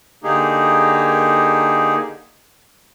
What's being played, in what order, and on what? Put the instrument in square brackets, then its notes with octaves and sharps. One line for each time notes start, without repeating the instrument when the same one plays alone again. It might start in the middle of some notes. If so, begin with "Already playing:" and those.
[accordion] D3 A#3 D#4 G4 G#4